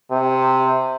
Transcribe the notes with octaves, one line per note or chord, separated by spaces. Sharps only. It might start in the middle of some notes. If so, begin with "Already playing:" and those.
C3